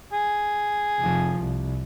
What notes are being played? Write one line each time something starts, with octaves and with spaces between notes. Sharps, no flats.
G#4
F1 F3
C2